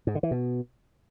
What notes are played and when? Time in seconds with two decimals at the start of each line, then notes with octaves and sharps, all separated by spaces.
0.07 G#2
0.15 D3
0.23 E3
0.31 B2